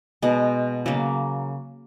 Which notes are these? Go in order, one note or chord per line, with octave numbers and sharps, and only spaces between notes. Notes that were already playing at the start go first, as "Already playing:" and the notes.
B2 G#3 B3
C#3 F#3 A#3